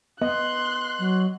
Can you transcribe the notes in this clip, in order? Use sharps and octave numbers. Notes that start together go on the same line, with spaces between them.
B3 D#5 C6 F#6
F#3